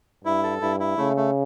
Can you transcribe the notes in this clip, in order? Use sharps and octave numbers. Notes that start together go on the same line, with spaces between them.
G2 E4
A4
G2 E4
E4
C#3 A3
A3